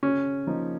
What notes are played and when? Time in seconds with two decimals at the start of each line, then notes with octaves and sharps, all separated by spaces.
0.03 C#3 C#4
0.47 F3 A#3 D#4